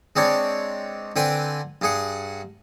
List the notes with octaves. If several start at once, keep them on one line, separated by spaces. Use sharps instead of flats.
G#3 C4 D4 C#5
D3 C4 B4 G5 G#5
G2 G#4 F#5